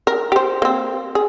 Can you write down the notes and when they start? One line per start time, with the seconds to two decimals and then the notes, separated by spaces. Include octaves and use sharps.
0.07 A#4
0.32 G4 C5
0.62 A#3 C4
1.15 G#4